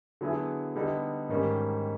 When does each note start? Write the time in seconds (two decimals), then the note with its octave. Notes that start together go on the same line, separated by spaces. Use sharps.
0.21 D3 F#3 B3 E4 G#4
0.76 D3 G3 B3 D#4
1.29 G#2 D#3 G3 A#3 C#4